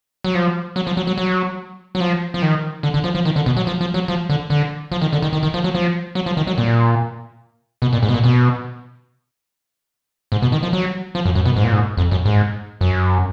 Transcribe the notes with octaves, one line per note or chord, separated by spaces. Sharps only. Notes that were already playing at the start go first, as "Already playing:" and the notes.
F#3
F3
F#3
F3
F#3
F#3
F#3
F#3
F3
F3
D#3
D3
D3
F3
F3
D#3
D3
B2
F#3
F3
F3
F#3
F3
D3
D3
F3
D#3
D3
D#3
D#3
D#3
F3
F#3
F3
F#3
F3
D#3
F#3
A#2
B2
A#2
G#2
B2
A#2
B2
G#2
B2
D#3
F3
F#3
F3
F#2
F#2
B2
G#2
A#2
G#2
F2
F#2
G#2
F#2